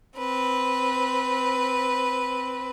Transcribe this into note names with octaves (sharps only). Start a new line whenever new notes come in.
C4 B4